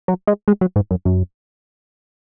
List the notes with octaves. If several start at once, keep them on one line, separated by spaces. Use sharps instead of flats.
F#3
G#3
G#3
F#3
G#2
F#2
F#2